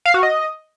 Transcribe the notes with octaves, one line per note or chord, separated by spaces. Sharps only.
F5
F#4
D#5